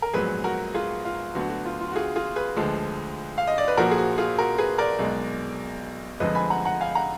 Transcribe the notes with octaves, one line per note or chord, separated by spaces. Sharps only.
A#4
A#1 G#2 F#3 B3 G#4 B4
F#4 A#4
F4 G#4
F4
D2 D3 F#3 B3 F#4
F#4
F4
F4
F#4
F4 G#4
F4 G#4
G#4 B4
D2 D3 F3 G#3
F5
D#5
D5
B4
A#1 A#2 F3 F#4 A#4
G#4
F#4
F4 G#4
F#4 A#4
G#4 B4
A#4 D5
B1 B2 G#3
F1 F2 D3 F3 G#3 B4 D#5
G#5 B5
F#5 A#5
F#5 A#5
F5 G#5
F#5 A#5